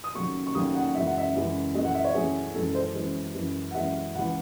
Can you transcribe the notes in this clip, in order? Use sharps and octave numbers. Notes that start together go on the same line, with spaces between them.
D#6
D#2 C#3 F#3 A3 C#6
C#6
D#2 C#3 F#3 A3 D#6
F#5
F#2 C#3 E3 G#3 E5
F#5
E5
F#2 C#3 E3 G#3
F#2 E3 A3 D#5
F#5
E5
C#5
F#2 E3 A3 G#4
F#2 E3 G#3 A4
A4
C5
F#2 E3 G#3
F#2 E3 G#3
F#5
F#2 E3 G#3 E5
C#2 C#3 E3 G#3 F#5